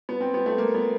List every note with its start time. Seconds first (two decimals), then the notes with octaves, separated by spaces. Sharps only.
0.09 B3
0.21 C4
0.34 B3
0.46 A3
0.58 A#3
0.74 B3